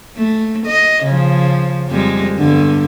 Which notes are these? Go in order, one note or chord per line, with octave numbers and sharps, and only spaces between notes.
A3
D#5
C#3 F3
F2 G3 G#3
E2 G2 D3